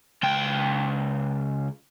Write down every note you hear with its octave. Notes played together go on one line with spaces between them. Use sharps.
C#2 G5